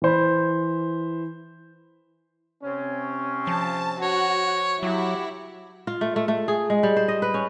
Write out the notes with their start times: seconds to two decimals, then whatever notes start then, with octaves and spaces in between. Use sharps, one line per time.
0.02 E3 C5 B5
2.64 C3 C4 C#4
3.47 F3 A5
4.02 F#4 C#5
4.83 F#3 E4 F#4 G4
5.87 F4
6.01 A3
6.16 A3
6.28 A3
6.48 G#4
6.70 G#3
6.83 G3
6.97 C5
7.08 D#5
7.22 B4
7.34 C#4